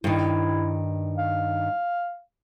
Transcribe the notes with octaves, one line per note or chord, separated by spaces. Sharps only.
G2 D#3 E4
F5